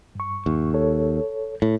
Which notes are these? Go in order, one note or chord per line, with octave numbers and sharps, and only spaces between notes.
G2 C#6
D#2
A4 C#5
A2